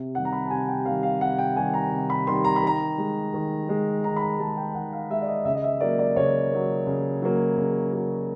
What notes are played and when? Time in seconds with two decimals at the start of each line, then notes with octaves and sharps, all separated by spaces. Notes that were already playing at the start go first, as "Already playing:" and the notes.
Already playing: C3
0.15 D#3 G3 F#5
0.25 A#5
0.32 B5
0.46 A5
0.50 C3 G#5
0.68 G5
0.85 D#3 G3 F5
1.03 F5
1.21 C3 F#5
1.38 G5
1.56 D#3 G3 G#5
1.74 A#5
1.92 C3
2.10 B5
2.27 D#3 G3 C6
2.44 A#5
2.56 B5
2.63 D#3 A#5
2.98 G#3
3.34 D#3
3.69 G#3
4.04 D#3 A#5
4.17 B5
4.21 A#5
4.39 G#3 A5
4.57 G5
4.75 D#3 F#5
4.93 F5
5.10 G#3 E5
5.22 D5
5.27 D#5
5.45 C#3 E5
5.55 D#5
5.64 E5
5.81 F#3 A#3 D5
5.99 D5
6.16 C#3 C#5
6.51 F#3 A#3
6.87 C#3
7.22 F#3 A#3
7.58 C#3
7.93 F#3 A#3